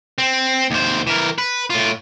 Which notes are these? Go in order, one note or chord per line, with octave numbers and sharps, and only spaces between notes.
C4
D#2 C5
E3 A#4
B4
A2 F4